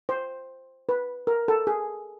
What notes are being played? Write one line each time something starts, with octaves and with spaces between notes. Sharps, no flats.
C5
B4
A#4
A4
G#4